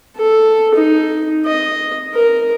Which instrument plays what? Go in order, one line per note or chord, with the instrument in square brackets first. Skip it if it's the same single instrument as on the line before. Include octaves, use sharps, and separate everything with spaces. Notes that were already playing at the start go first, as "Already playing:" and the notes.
[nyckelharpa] A4
D#4
D#5
A#4